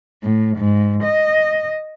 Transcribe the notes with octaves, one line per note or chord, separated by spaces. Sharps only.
A2
G#2
D#5